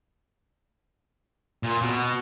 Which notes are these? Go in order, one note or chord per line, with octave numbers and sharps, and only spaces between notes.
A#2
B2